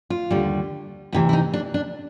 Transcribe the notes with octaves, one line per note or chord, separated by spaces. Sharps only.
F4
D#2 D3 G3
D2 C3 E3 E4
E4
D#4
D4
D4